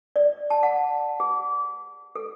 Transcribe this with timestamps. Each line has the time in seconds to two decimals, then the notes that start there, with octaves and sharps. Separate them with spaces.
0.16 D5
0.50 A5
0.63 F#5
1.20 G#4
2.15 A4